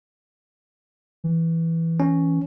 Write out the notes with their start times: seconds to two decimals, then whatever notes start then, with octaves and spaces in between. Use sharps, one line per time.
1.24 E3
2.00 C#4